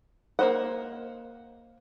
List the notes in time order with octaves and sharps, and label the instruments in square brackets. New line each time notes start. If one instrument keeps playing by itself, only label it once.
[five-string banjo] A#3 E4 C5 D#5 F#5